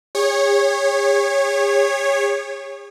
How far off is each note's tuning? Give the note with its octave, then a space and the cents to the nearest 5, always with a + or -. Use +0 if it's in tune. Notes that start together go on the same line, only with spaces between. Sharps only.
G#4 -45 C#5 -10